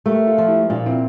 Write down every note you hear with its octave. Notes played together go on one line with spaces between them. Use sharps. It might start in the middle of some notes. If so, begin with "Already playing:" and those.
A3 G4 A#4
F4 A4
F3
E4 G4
A#2 D4 F4
C4 E4